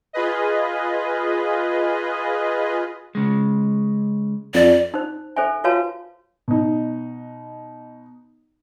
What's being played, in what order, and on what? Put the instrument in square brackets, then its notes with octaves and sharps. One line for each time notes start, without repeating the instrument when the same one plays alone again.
[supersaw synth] F4 G#4 B4 D#5
[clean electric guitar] C#3 G#3
[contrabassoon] F2 [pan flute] D5
[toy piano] D#4 C5
A4 C5 E5 G#5
F4 F#4 B4 C#5 F5 A5
[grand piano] B2 D#4